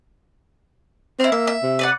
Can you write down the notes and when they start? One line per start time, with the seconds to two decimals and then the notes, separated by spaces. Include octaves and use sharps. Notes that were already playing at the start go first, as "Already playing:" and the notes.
1.20 C4 E4 F5
1.32 A#3 E5
1.47 E5
1.63 C3
1.79 B4 D5 F#5